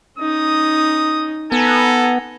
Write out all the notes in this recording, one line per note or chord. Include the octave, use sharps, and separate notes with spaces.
C#4 D#4 D#6
B3 A4 G#5 A#5